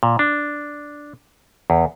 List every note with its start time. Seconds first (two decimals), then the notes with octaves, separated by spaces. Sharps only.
0.03 A#2
0.19 D4
1.70 E2